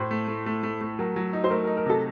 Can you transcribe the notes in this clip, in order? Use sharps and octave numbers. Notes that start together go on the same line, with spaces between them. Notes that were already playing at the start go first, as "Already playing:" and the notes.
Already playing: A2 C5
A3
A3
A3
A3
A3
F#3 A#4
F#3
D#4
C5
A3 A#4
D#4 A#4
A#4
C3 A4